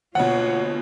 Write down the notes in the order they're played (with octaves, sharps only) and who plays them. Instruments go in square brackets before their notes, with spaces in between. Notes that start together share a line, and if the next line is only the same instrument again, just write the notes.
[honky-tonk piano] D2 B2 [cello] A#3 F4 [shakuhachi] C#5 [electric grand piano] F#5